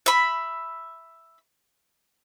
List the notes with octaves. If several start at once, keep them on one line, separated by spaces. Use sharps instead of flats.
E5 B5